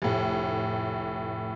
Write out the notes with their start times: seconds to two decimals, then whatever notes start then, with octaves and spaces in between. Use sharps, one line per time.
0.02 F1 A2